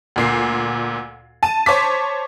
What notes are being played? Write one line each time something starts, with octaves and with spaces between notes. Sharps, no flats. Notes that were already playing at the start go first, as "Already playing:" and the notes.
D2 A#2 C7
A5 D#7
C5 C#5 A5 D6 B6